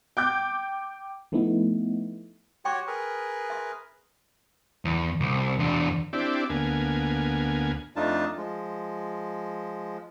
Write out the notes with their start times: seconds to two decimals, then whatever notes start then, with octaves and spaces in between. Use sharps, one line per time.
0.17 G5 D6 G6
1.32 F3 A3 B3 D#4 E4
2.65 F#4 G4 C#5 G5 C6 C#6
2.87 G#4 A#4 B4
3.50 E5 C6
4.85 E2
5.20 C2
5.59 E2 D4
6.13 C4 D4 E4 G4 D5
6.49 D2 A#3 B3 G#5
7.96 F2 A3 D4 D#4 F4 A5
8.37 F3 G#3